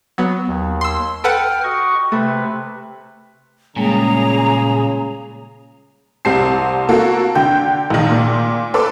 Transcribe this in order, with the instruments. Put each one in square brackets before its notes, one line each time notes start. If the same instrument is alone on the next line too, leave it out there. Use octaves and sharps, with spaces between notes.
[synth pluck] F#3 B3
[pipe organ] D#2
[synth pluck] C6 E6
[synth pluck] A4 B4 F#5 [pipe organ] G5 F6
[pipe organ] F#4 D#5 C#6
[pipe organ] C3 B4 [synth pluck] A3
[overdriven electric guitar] A#2 [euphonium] C#3 [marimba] G3 G#3 A#3 [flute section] G#4 A#5
[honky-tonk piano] C2 G3 C4 A5 C7
A#3 F#4 A4
D3 G5 G6
A#1 D#3
A#2
A4 B4 C6 D6